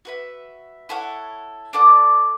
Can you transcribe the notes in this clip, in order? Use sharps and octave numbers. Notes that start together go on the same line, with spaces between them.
F#4 B4 E5
E4 A4 C#5 F#5
D4 A4 D5 F#5